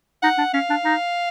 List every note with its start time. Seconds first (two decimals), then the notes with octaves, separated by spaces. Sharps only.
0.23 D#4 F#5
0.38 D4
0.54 C#4 F5
0.70 D4
0.85 D#4